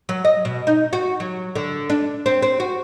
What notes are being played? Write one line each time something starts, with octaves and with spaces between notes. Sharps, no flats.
F#3
D#5
B2
D#4
F#4
F#3
D3
D4
C4
C4
F#4